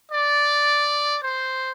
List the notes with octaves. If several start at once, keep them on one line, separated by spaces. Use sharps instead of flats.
D5
C5